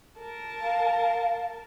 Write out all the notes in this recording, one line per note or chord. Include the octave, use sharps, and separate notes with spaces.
A#4 A5
F5